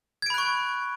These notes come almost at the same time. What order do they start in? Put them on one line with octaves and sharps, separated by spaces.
G#6 D7 B5 F#6 C#6